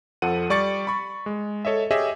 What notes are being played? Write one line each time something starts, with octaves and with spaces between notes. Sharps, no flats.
F2 F3 A4 F#5 D#7
G3 D5 C#6 A6 C#7
B5 C#6
G#3
A4 C#5 D#5 E5
G4 G#4 C#5 D#5 E5